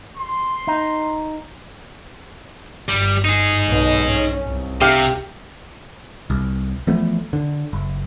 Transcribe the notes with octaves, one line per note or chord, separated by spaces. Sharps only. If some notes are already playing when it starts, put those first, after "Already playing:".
C6
D#4
G1 G3
D#4 G#4
B1 B2
C#4
C2
C3 G4 F5
C2
E3 F3 A3 B3
D3
F#1